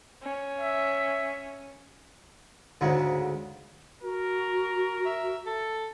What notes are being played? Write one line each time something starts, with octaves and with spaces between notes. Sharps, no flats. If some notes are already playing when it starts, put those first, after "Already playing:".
C#4
E5
D2 G#2 C#3
F#4 A#4
E5
A4